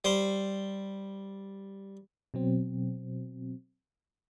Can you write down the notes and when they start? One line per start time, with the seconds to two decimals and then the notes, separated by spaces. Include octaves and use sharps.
0.04 G3 C5
2.34 B2 F#3 C4